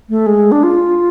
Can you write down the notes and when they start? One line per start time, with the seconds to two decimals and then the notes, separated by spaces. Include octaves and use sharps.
0.09 A3
0.26 G#3
0.52 D4
0.63 F4